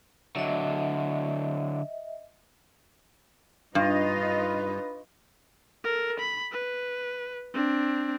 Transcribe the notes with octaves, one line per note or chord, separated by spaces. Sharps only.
D3 F#3 D#5 E5
G2 D#4 F4 B4 D#5
A4 A#4
B5
B4
C4 D4